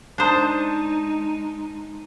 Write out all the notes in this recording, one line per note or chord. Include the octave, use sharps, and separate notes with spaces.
G#3 D4 D#4 C5 A5 D#6 G6